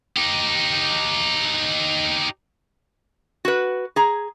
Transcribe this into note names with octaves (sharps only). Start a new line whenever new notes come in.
D#4 G4
F#4 B4
G#4 A#5